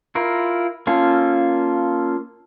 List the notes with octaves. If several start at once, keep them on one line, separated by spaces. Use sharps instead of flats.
E4 F4 A#4
A#3 C#4 F4 A4